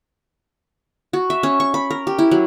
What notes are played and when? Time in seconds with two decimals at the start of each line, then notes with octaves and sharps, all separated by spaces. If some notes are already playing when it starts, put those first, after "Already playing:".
1.13 F#4
1.30 E5
1.43 C#4
1.60 C#6
1.74 B5
1.90 A#4
2.07 G4
2.19 E4
2.31 F#3